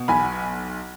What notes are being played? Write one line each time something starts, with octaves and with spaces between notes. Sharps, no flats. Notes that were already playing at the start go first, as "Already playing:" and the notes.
Already playing: B2
B1 G#5 B5